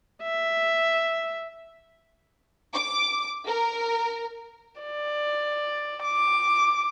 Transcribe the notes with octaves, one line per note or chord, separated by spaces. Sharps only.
E5
D6
A#4
D5
D6